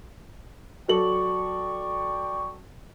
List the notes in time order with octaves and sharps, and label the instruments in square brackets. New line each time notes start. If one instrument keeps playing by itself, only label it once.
[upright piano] F#3 A4 F#7 [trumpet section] D5 G5 C#6